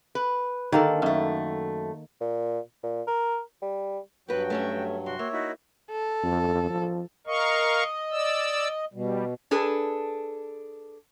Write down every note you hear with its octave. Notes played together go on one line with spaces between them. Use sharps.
B4
D3 D#3 A#3 A4
F#2 A3
A#2
A#2
A#4
G3
G2 F#3 B3 F#4 B4 G5
A3 C#4 E5
C3 F#4 C6
A#3 C#5 E5
D#4 E4 F#4
A4
F2
F3
A#4 D#5 F5 C#6
D5 E6
B2 G3
D4 G#4 A4 B4